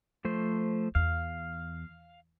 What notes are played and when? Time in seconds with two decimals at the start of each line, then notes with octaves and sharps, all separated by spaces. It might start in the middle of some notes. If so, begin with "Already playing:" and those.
0.25 F3 A3 C5
0.95 E2 F5